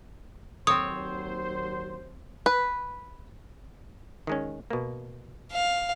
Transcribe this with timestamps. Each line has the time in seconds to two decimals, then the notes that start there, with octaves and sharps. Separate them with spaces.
0.67 D#2 F#3 C4 C5 C#5 D#6
2.46 B4
4.27 D#3 G#3 C#4
4.70 B2 A#3
5.52 F5